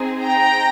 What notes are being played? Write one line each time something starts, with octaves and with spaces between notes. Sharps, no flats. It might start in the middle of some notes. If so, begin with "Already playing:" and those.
Already playing: C4 D#4 G#4
G5 A#5